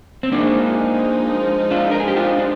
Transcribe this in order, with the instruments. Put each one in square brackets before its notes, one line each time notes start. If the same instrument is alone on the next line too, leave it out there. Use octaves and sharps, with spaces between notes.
[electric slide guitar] C4
[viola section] F3 G#3 D#4 [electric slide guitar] A#3 D4
[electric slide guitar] D4 F4
A#4
G#4
G4
D4 F4
D4